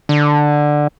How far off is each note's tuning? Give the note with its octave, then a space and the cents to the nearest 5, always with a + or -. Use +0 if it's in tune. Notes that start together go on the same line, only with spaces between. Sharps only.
D3 +10